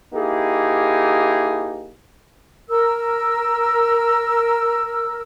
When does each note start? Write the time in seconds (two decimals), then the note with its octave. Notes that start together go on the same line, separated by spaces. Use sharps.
0.13 A#3 D#4 E4 G4 G#4
2.70 A#4 E6